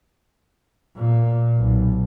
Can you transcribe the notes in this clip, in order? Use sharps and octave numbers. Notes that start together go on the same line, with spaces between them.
A#2
B1